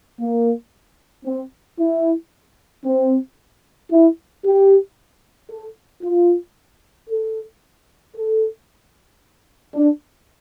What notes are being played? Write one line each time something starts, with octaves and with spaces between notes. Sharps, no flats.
A#3
C4
E4
C4
E4
G4
A4
F4
A4
A4
D4